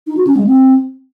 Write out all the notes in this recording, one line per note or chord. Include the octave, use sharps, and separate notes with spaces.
D#4
F#4
C#4
G#3
C4